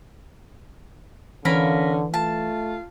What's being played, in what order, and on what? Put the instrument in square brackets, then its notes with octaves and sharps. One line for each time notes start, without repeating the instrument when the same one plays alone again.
[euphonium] D3 [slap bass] E3 [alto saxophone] C#4 [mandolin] A#4 F5 B5
[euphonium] A3 [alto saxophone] F4 [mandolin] A5